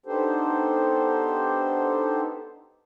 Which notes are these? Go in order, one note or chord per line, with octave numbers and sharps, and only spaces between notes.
B3 D4 D#4 G4 A4 C5